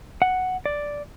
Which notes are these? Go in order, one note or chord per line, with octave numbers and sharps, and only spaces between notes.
F#5
D5